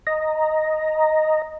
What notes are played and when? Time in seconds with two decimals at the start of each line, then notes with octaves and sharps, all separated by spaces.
0.07 D#5 A#5